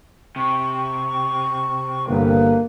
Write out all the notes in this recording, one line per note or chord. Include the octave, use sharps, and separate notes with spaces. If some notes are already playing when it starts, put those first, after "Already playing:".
C3 C#6
G1 A#3 B4